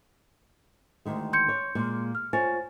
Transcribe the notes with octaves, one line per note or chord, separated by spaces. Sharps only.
D2 D#3 G#3
C6 G6 C#7
C#5
A#2 G#3 A#3
F6
F4 C5 C#5 G#5 A6